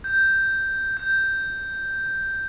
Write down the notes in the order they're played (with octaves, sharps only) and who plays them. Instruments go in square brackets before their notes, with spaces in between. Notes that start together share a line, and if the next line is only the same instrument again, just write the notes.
[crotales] G6
G6